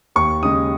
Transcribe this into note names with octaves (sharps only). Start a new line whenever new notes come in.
D#2 C#6
C#3 G#3 D#6